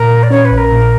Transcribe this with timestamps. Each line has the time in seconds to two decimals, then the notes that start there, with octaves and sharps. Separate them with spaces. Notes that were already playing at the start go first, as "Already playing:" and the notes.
Already playing: A#2 A#4
0.11 A#2
0.23 D5
0.31 C#4 C#5
0.45 B4
0.52 A#1
0.57 A#4
0.72 A#2